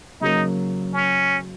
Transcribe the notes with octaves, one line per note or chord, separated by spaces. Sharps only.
C#3 F#3 A#3 D#4
C#4